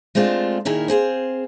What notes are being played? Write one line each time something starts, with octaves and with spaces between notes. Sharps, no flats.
G#3 A3 C4 D4 F4
A#2 D#3 E4 G#4 A#4
C4 G#4 C5 F5